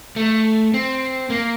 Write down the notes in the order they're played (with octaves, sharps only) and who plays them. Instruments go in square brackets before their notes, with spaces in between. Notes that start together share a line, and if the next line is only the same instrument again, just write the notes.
[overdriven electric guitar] A3
C4
A#3